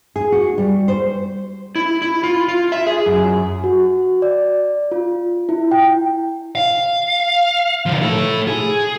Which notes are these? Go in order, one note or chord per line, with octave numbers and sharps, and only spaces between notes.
G#4
F#4
G3
C5
E4
E4
F4
F4
E5
G#4
F#2
F#4
D5
F4
E4
G5
F5
D3 F3
A2 A4
G#4